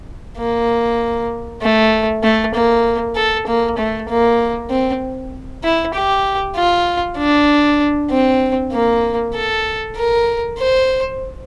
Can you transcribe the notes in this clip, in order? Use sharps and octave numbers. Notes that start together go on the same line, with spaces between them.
A#3
A3
A3
A#3
A4
A#3
A3
A#3
C4
E4
G4
F4
D4
C4
A#3
A4
A#4
C5